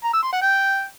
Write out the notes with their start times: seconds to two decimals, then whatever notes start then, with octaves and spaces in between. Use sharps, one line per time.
0.04 A#5
0.13 E6
0.23 C6
0.32 F#5
0.42 G5